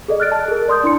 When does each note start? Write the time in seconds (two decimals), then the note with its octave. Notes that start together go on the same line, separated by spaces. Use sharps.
0.08 G#4 A4 D5 D#5
0.20 F6 F#6 A6 D7
0.32 A5
0.48 G#4 A#4
0.68 D5 C6 D#6 G6
0.84 D4 E4 C6 C#7